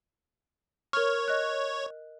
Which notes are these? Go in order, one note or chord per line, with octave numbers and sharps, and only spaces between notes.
A#4 C#5 F6
D#5 F#6